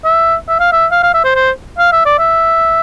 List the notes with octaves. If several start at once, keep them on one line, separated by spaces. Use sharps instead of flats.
E5
E5
F5
E5
F5
F5
E5
C5
C5
F5
E5
D5
E5